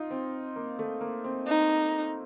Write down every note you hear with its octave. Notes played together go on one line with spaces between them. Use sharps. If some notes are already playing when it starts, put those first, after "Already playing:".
Already playing: D#4 F4
C4
A#3
A3
A#3
C4
D#4